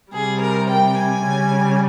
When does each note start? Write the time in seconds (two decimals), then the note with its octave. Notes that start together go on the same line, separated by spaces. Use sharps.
0.12 C3 G3 G#4
0.41 A#4
0.70 G5
0.97 G#5
1.25 C#3 G3